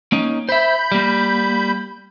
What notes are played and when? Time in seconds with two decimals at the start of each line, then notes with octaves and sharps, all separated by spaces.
0.12 A#3 C#4 D#4
0.49 C5 E5 B5 G6
0.92 G3 A#3